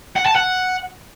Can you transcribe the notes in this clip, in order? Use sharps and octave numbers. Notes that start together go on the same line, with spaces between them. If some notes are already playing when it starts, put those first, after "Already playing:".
F#5
A5
F#5